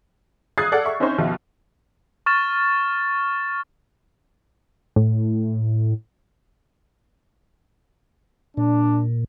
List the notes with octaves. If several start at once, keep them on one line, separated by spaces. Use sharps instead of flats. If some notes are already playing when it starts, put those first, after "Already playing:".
D#6 F6 F#6 G#6 A6 C7
A4 D5 F#5
E5 C#6
C4 C#4 D#4 E4 C5 C#5
D#2 B2 F3 F4 E5
C#6 F6 A6 E7
A2
A#2 D4